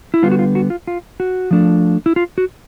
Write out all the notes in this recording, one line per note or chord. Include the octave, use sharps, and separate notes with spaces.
E4
D3 G3 B3 F4
F#4
F4
F#4
F4
F4
F#4
F3 A3 D4
E4
F4
F#4